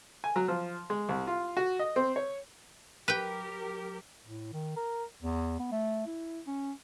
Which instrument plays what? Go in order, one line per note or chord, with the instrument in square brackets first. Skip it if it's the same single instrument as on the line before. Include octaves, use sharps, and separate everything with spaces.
[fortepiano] G#5
F#3
F3
G#3
C2
F4
F#4
D#5
C4
C#5
[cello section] F#3 G4 A#4 [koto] B4 G5
[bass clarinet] A2
D#3
A#4
E2
B3
A3
E4
C#4